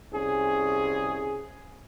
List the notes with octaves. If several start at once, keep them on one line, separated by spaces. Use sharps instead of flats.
C2 C#4 G#4